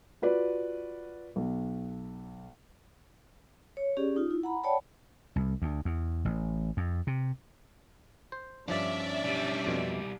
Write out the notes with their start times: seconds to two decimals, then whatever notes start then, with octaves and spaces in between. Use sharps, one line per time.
0.22 F4 F#4 B4 D5
1.36 B1
3.77 C#5
3.97 C#4 G4 G#4 D5
4.16 D#4 F4
4.31 E4
4.43 F#5 A#5 B5
4.63 C#5 D5 F#5 G5 A5 B5
5.36 C2
5.62 D2
5.85 E2
6.25 A1
6.77 F2
7.07 C3
8.32 C5
8.68 G2 F3 C#4 D4 D5 E5
9.23 B1 G3
9.66 F2 B2